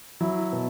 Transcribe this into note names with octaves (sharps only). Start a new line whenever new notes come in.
F#3 E4
B2